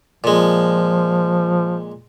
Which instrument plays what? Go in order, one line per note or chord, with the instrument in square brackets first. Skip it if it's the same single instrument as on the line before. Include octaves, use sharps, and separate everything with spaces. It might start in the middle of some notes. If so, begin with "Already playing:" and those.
[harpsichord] A#2 G#3 [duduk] F3